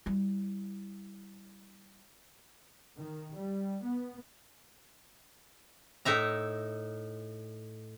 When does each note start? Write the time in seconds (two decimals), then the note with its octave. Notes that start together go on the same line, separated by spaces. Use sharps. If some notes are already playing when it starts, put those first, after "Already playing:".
0.06 G3 E4
2.97 D#3
3.33 G3
3.82 B3
6.05 A2 D#4 E5 A#5